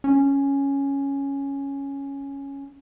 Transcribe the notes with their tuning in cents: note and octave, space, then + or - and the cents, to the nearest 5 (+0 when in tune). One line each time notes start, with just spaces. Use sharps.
C#4 +0